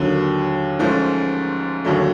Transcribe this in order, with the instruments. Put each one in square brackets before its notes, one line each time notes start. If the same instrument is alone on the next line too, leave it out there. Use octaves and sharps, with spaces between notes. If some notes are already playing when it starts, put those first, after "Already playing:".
Already playing: [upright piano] D#2 D3 F#3
G#2 F3 A3 C#4
D#2 D3 F#3 A3